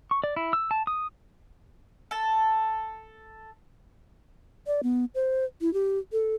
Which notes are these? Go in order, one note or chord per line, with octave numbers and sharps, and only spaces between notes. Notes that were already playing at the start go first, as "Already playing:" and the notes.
C#6
D5
E4
E6
A5
D#6
A4 A5
D5
B3
C5
E4
G4
A4